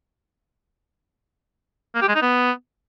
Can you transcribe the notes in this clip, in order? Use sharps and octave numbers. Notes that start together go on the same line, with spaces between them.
A#3
G4
G#3
D#4
B3